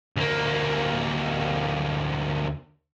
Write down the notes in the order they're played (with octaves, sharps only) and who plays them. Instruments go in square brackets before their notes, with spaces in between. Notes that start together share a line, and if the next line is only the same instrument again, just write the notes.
[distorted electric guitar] D2 A#3